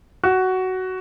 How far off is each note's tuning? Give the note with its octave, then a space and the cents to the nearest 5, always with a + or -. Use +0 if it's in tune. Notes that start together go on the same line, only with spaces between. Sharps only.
F#4 +10